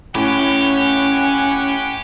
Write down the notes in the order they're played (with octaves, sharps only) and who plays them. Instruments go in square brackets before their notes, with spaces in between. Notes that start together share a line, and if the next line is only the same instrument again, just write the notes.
[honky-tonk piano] A2 [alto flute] C#4 [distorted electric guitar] G4 [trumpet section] F#5 G#5